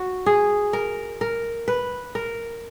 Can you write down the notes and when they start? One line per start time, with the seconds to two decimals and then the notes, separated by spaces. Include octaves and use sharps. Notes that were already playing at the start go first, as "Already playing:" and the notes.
Already playing: F#4
0.26 G#4
0.73 A#4
1.21 A#4
1.68 B4
2.15 A#4